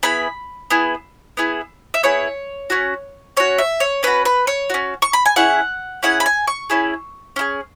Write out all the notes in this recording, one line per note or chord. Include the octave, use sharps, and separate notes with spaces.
B3 E4 G#4 B5
B3 E4 G#4
B3 E4 G#4
E5
B3 E4 G#4 C#5
C#4 F#4
C#4 F#4 C#5
E5
C#5
C#4 F#4 B4
B4
C#5
C#4 F#4
C#6
B5
G#5
C#4 E4 G#4 F#5
C#4 E4 G#4 F#5
B5
G#5
C#6
C#4 E4 G#4
C#4 E4 G#4